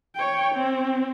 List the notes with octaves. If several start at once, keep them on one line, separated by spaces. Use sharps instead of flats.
C#5 G5
C4